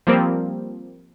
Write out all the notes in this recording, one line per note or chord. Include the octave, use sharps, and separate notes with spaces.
F3 G3 A#3 C4